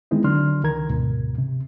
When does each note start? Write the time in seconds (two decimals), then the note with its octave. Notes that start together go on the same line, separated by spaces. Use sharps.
0.11 D#3 G#3 B3 C4 D#4 E4
0.24 D3 F#3 D4 C6 F6
0.64 C#2 D#3 A#4 A#5 G#6
0.90 D2 G#2 B2
1.38 C3